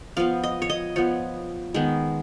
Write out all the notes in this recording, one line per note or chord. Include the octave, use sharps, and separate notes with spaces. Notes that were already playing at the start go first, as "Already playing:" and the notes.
F3 B3 F5
D#5
C#5
D#5
F3 B3 C#5
D#3 G#3 B3